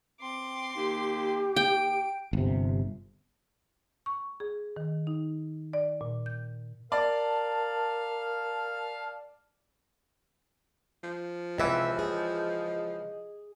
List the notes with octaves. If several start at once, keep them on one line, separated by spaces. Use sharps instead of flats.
C4 C6 D6
D#2 G4
D#2 G5 D7
G1 C3
C#6
G#4
D#3
D#4
D5
A#2
G6
A#4 D5 F5 A5
F3
C#2 C3 E3 E5
G#4 D#5